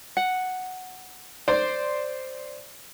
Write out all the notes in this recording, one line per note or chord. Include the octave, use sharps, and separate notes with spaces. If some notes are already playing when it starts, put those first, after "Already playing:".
F#5
C5 D5 C6